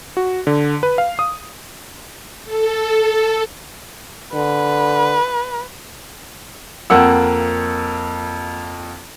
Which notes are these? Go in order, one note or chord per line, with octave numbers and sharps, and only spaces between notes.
F#4
D3
B4
F5
D#6
A4
D3 B4
F2 A#3 F#5 G5 E6